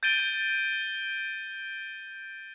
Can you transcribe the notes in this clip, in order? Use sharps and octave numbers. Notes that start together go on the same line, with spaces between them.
G6 A6 D7 D#7 G7